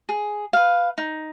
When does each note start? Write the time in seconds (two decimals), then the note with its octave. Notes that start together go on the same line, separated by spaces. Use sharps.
0.09 G#4
0.53 B4 F5
0.98 D#4